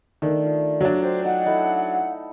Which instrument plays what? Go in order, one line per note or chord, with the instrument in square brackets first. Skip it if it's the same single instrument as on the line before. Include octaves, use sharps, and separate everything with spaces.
[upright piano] D#3 [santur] A3 D4
[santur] F4
[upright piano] F#3 D4
[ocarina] C5 [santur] G5
[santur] D#4 [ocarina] F#5
[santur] D#4 E4 A4